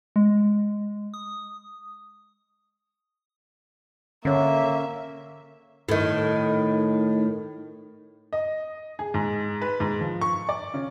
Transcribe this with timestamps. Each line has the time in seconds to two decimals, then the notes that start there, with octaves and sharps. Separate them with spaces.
0.16 G#3
1.14 D#6
4.25 D3 A#3 C#4 C#5 E5
5.89 A2 D#3
8.33 D#5
8.99 G#4
9.14 G#2
9.62 B4
9.80 G#2
10.01 F3
10.21 C#6
10.49 D5
10.74 C#3